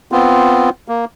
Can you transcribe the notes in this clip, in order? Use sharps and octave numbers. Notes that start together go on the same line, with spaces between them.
B3 C4 F4
A#3